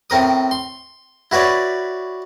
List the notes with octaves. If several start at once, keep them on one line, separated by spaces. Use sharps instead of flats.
A2 C4 A#4 D#6
C6
E4 F#4 B4 C#5 D5